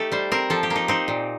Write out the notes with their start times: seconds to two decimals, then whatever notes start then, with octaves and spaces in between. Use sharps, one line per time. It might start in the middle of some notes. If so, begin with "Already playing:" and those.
Already playing: A3 D#4 G4 A4
0.12 G3 C5
0.32 C4 A#4
0.50 F3 A4
0.63 G4
0.70 A#3
0.76 D#4
0.88 C4 D#4
1.08 A#2